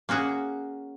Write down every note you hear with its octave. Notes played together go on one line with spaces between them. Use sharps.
A#3 C#4 F#4 G#4